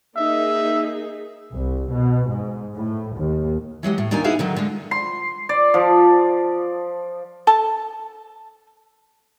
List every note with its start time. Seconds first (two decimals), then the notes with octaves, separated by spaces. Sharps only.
0.16 A#3 D#4 G#4 E5
1.53 C2
1.91 B2
2.30 G#2
2.76 A2
3.16 D#2
3.83 E3 F#3 G#3 G4
3.98 A2
4.11 D#2 A#2 D4 D#4 A#4 G#5
4.24 B3 D#4 E4 F#4 G#4 F5
4.39 D3 D#3 F#3
4.56 D3 G#3
4.91 C6
5.49 D5
5.74 F3
7.47 A4 A5